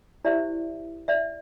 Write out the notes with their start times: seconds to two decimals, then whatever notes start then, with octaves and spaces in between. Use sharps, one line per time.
0.25 E4 G4 C5 D5 E5
1.08 D5 E5